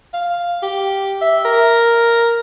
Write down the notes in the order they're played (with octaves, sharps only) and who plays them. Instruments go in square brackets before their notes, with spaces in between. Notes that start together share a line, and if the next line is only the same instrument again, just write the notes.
[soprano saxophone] F5
G4
E5
A#4